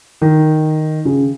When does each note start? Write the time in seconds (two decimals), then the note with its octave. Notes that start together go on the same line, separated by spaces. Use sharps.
0.22 D#3
1.05 C#3